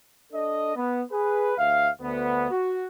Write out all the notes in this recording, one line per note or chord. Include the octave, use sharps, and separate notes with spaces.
D4 A4 D#5
B3
G#4 B4
D2 E5 F5
D2 B3
F#4